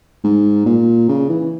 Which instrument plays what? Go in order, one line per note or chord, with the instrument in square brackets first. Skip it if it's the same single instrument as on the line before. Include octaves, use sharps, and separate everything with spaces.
[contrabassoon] G#2
A#2
C#3
E3